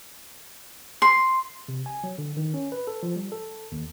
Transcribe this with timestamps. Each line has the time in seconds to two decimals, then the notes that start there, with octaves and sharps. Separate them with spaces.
1.02 C6
1.68 C3
1.86 G#5
2.04 F#3
2.18 D3
2.37 D#3
2.54 C#4
2.72 B4
2.87 A4
3.03 F3
3.16 G3
3.32 A4
3.72 D#2